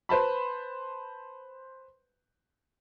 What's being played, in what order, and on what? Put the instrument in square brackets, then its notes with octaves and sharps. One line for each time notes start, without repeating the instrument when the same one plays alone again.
[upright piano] B4 C5 A5 B5